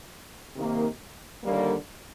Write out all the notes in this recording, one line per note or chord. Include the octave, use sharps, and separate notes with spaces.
C3 D#3 A#3 D#4
D#2 D3 G3 A#3